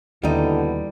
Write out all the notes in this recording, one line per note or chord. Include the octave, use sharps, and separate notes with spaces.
D#2 B2 D3 G3 B3 D#4 E4